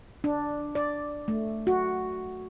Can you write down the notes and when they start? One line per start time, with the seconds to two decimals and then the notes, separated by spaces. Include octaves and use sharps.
0.24 D4
0.75 D5
1.28 A3
1.67 F#4